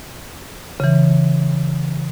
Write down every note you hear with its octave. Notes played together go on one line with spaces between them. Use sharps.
C#3 E3